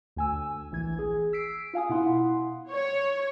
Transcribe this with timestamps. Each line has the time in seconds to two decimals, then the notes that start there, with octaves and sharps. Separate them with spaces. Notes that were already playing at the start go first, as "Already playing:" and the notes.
0.16 D2 G#5 E6
0.72 A#1 E3 G#6
0.99 G#4
1.33 E6 B6 C7 D7
1.73 F4 F5 G#5 D#6
1.89 B2 E4 F#5 C6
2.70 C#5